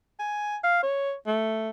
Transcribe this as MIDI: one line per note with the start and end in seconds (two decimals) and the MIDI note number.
0.19 0.56 80
0.64 0.82 77
0.83 1.14 73
1.27 1.70 57